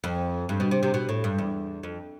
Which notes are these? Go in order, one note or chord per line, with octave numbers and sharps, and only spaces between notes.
F2
G2
B2
C3
C3
B2
A2
G2
E2
F2